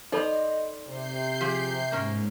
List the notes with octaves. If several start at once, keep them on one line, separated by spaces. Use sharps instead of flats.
D#4 A4 C5 D5 D#5 B5
C3 G6 C7
F3 G4 G#4
G#2 A#3 C#4